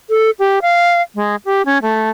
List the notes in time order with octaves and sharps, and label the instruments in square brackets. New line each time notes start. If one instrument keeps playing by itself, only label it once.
[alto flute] A4
G4
F5
G#3
G4
C#4
A3